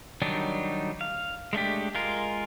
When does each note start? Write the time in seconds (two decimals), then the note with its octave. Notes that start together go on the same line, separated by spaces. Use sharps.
0.22 D#3 F#3 G3 D4 D#4
1.01 F5
1.53 G#3 A3 D4 G4
1.95 G#3 F4 A#4